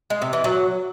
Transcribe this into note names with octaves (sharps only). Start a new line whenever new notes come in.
G#3
C3
E3
F#3